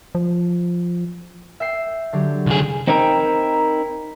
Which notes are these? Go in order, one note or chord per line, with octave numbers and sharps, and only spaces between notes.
F3
E5 G5 C7
D3 F#3 G4
C2 G#4
C4 D#4 E4 A#4 G5